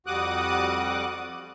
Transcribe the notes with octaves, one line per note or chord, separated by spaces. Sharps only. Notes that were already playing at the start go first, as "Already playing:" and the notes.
F2 G3 F#4 D6 D#6 F#6